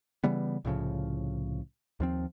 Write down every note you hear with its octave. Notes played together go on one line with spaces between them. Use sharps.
C#3 E3 G3 B3
C2 A2 C#3 F3
D#2 F3 C4